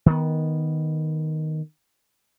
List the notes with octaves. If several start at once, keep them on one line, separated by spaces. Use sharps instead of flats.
D#3 B3